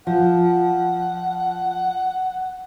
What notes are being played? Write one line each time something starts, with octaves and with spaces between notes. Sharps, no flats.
F3 F#5